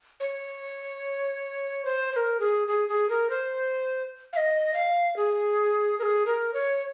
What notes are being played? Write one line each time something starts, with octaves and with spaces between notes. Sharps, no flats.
C#5
C5
C5
A#4
G#4
G#4
G#4
A#4
C5
F5
D#5
F5
G#4
A#4
G#4
A#4
C#5